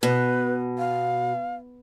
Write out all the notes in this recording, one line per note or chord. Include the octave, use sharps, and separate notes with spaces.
B2 B4
F5